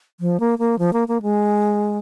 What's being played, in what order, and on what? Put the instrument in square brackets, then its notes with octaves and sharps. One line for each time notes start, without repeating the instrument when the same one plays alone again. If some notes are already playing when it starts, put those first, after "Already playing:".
[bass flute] F3
A#3
A#3
F3
A#3
A#3
G#3